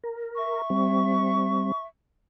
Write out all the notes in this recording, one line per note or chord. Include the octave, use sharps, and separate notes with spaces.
A#4
E5 C#6
G3 C4